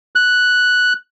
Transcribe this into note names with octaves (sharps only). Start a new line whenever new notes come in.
F#6